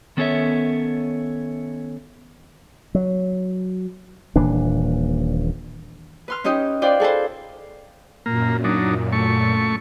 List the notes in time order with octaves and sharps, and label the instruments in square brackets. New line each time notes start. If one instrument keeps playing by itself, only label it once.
[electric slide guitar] D#3 B3 C#4 A4 C#5 E5
[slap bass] F#3
D#1 A#2 E3 D4
[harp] B4 C6 F6
C#4 D#4 G4 D#5
F4 B4 C5 D5 G5
G#4 A4 B4 C5
[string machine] F#2 A#2 [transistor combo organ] A#3
[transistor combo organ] F#3 D4 D#4
A3 C#6